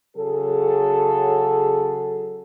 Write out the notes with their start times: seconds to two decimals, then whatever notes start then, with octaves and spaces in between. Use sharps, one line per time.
0.17 C#3 F#3 G#4 A4